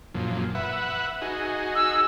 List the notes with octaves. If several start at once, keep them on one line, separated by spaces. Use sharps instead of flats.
F#2 A#2 F3
B4 E5 F#5
D#4 F#4 G#4
E6